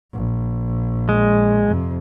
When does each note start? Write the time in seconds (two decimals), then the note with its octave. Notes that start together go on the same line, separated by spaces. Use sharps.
0.13 A#1
1.09 G#3
1.67 F2 C3